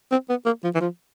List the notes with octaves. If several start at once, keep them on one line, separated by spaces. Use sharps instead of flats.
C4
B3
A#3
F3
E3
F3